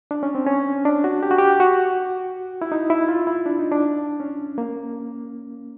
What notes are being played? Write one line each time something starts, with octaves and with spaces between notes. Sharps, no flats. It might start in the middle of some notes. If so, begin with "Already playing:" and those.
D4
C#4
C4
C#4
D4
F#4
G4
F#4
G4
F#4
E4
D#4
E4
F4
E4
D4
D#4
D4
C#4
A#3